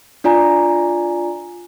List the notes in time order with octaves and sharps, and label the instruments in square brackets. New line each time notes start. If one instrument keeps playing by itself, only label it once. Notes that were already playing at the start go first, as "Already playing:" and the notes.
[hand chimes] D4 F4 D5 G#5 A#5